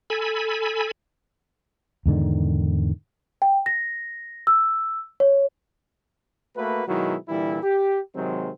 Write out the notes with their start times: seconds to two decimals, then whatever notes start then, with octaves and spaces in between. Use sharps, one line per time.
0.10 A4 G#5 B5
2.06 E2 G#2 D3 D#3
3.42 G5
3.66 A#6
4.47 E6
5.20 C#5
6.57 A3 A#3 F#4 B4
6.88 B2 D#3 F#3 G#3 E4 F#4
7.29 A#2 D3 E3 G3 E4
7.62 G4
8.15 C3 D#3 F#3 G#3 C4